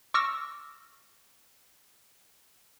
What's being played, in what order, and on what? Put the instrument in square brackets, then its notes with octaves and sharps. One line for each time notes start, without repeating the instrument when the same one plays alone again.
[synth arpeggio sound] C#6 D6 E6 F6 A#6